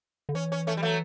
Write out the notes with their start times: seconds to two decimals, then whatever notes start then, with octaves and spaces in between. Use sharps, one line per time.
0.29 D3
0.34 E3 C#4
0.52 C#4
0.67 A3 C#4
0.77 G3
0.83 F#3 A3